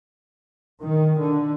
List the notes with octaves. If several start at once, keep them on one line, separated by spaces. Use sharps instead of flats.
D#3
D3